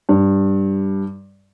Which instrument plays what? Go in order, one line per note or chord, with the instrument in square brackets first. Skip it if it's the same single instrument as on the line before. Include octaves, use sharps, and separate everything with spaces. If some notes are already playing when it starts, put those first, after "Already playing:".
[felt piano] G2